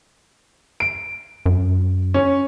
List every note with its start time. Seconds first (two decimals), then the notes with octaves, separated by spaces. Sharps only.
0.80 D7
1.46 F#2
2.14 C#4